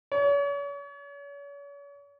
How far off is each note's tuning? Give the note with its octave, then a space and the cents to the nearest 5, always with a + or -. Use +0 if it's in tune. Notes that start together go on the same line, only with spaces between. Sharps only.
C#5 +40